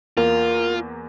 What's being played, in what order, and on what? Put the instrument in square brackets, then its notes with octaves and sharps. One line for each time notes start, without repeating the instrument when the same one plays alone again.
[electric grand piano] E2 A#3 [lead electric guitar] F4 [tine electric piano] A#4